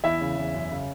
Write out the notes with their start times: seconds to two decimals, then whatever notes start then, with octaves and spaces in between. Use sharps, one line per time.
0.04 E2 E4 E5
0.21 C#3
0.37 E2
0.54 F#2
0.71 C#3